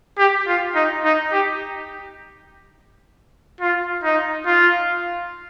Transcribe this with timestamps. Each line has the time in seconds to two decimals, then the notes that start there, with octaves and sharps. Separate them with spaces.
0.18 G4
0.47 F4
0.75 D#4
1.04 D#4
1.32 G4
3.61 F4
4.03 D#4
4.46 F4